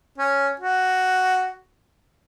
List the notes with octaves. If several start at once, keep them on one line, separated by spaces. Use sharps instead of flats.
C#4
F#4